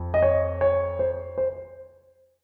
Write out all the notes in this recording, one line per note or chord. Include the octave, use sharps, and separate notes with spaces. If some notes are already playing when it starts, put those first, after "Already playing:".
Already playing: F2
D#5
C#5
C#5
C5
C5